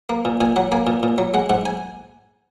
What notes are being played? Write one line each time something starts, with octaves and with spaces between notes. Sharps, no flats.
A#3
A#2
A#2 G#5
F#3 F#5
A#3 G#5
A#2
A#2
F#3
G#3 F#5
G#2 F#5
G#5